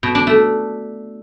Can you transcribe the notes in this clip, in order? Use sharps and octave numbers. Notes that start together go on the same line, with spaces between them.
B2
D4
A3